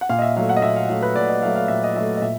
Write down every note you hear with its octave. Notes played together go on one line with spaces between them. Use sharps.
F#5
A#2 F5
D#5
E5
F#3 A3 F5
F#5
D#5
A#2 E5
F5
F#3 A3 F5
B4
A#2 D5
D#5
F#3 A3 F5
F5
A#2 E5
D#5
F#3 A3 E5
D#5
A#2 E5